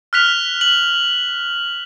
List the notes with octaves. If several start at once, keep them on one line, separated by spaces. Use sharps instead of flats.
F6 F#6 B6 F7
F#7